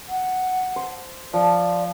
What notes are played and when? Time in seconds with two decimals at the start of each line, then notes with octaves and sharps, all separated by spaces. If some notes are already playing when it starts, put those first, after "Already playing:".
0.09 F#5
0.76 C5
1.33 F3 D5